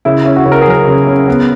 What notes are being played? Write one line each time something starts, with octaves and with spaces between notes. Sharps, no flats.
C#3 E4
C#4
F#4
C#3
A#4
G#4
F#3 A#4
C#3
C#4
B3